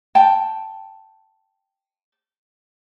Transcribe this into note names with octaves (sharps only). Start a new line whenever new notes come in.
G5 A5